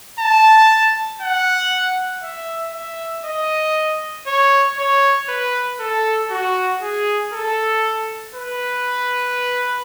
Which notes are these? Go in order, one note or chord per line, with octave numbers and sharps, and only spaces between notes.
A5
F#5
E5
E5
D#5
C#5
C#5
B4
A4
F#4
G#4
A4
B4